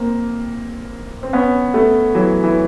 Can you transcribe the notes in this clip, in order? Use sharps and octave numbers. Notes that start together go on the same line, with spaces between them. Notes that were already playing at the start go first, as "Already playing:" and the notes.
Already playing: A#3 C4
C4
B3 C#4
A3 B3
E3 F#3
E3